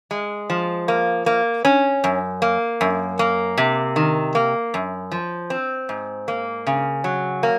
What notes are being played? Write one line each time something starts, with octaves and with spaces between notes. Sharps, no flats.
G#3
F3
A#3
A#3
C#4
F#2
A#3
F#2
A#3
C3
D#3
A#3
F#2
F3
C4
G#2
A#3
C#3
F#3
A#3